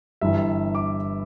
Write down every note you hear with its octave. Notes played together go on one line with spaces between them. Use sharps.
G1 G2 E3 E5
D6